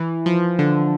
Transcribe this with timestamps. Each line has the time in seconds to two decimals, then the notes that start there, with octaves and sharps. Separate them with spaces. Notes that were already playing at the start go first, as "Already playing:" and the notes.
Already playing: E3
0.26 F3
0.59 D3